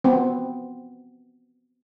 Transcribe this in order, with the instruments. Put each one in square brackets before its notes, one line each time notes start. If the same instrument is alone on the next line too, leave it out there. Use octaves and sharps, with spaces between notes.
[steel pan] B3 C4